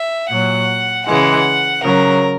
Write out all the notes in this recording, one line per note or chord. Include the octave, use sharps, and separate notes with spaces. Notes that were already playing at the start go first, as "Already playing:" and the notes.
Already playing: E5
A#2 F#3 F#5
C#3 E3 G#3 F#5
C#3 F#3 A#4